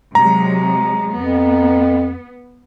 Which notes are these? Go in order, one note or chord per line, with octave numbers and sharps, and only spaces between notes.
C3 F#3 G#3 A#5
F2 B3